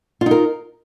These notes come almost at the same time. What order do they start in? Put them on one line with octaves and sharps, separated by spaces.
F4 D#4 A#4